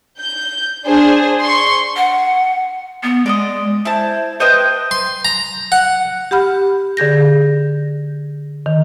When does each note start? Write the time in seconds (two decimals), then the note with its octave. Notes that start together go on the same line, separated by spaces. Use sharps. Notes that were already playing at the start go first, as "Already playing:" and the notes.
0.19 G6
0.84 D4 G#4 C5
1.42 C6 C#6
1.97 F#5
3.03 B3
3.26 G#3 D5 D#5
3.85 E4 C5 A5
4.40 B4 C5 D#5 G5
4.91 C6
5.25 A#5
5.72 F#5
6.31 G4 F#5 B5 F6
6.97 D3 G#4 G6 A#6
8.66 D#3